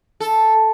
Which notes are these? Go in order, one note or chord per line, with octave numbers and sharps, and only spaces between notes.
A4